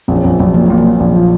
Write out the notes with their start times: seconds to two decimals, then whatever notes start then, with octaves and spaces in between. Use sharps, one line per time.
0.08 A#1 C4
0.16 C#4
0.23 A#1 C4
0.39 A#1 F#3
0.54 A#2 F3
0.66 A#2 F#3
0.78 F3
0.84 A#2
1.00 A#1
1.15 F3